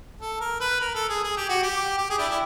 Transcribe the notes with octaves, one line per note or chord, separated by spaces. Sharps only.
A4
A#4
B4
A#4
A4
G#4
G#4
G4
F#4
G4
G4
G#4
D4 E4 G4
E4